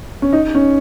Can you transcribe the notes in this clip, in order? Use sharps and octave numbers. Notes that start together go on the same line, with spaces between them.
C#4
D#4
C#4